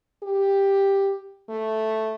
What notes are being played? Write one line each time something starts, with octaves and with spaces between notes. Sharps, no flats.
G4
A3